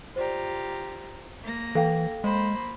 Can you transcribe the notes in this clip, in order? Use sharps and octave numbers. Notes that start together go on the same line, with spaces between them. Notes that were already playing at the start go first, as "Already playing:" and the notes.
F4 G4 C5 D5 A#5
A#3 A#6
E3 A4 F5 G5
G#3 A#3 C5 B5